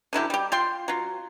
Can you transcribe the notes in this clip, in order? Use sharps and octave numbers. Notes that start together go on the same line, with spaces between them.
D3 F#3 E4 G4
G3 G4
F4 G5 C6
F#3 F4